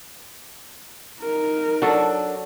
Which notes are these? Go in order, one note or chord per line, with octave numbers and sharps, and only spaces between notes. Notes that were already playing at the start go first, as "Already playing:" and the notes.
D#4 A#4
F#3 D4 F#4 A4